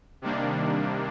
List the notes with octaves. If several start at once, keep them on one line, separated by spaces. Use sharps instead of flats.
C3 D#3 G3 A#3 D4